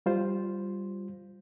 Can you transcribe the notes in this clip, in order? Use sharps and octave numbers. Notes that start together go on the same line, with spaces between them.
G3 F4 C5